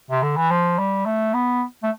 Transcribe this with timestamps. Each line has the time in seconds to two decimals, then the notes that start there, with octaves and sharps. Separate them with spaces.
0.10 C3
0.23 D3
0.37 E3
0.50 F3
0.79 G3
1.06 A3
1.34 B3
1.83 A3